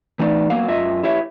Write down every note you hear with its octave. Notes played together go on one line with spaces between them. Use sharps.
E3 A3 D#4 D5
F#3 A#3 B3 F5
F#2 F4 D#5 E5
E4 G4 C#5 E5